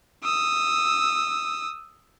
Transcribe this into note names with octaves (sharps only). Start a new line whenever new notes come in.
D#6 E6